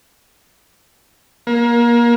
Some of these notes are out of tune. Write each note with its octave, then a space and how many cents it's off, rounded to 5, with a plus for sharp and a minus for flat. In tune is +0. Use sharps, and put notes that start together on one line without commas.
A#3 +25